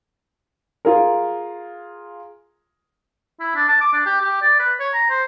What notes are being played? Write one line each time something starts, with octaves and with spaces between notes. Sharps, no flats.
F4 G#4 A#4
E4
D4
A5
D6
D4
G4
G4
D5
B4
C#5
A#5
C5